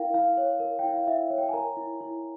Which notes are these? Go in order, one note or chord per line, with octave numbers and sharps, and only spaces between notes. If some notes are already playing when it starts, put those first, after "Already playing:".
Already playing: E4 A#4 F5 G5
E4 F5
C#5
A#4
E4 G5
F5
E4 E5
C#5
G5
G#5
A#4 A#5
E4
E4